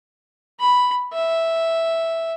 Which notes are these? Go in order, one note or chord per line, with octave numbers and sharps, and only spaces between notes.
B5
E5